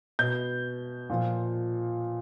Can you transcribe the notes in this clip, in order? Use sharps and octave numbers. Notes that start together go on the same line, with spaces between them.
B2 G6
A#2 F3